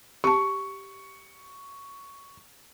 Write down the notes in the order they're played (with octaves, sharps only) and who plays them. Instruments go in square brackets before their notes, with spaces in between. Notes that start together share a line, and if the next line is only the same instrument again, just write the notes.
[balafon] G4 A5 [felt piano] C#6